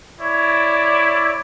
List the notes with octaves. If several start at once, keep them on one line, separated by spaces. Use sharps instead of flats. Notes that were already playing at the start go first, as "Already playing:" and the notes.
E4 C#5 D5